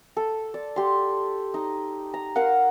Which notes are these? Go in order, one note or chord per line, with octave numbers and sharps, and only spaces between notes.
A4
D5
G4 C6
D#4
A#5
A#4 F5 F#5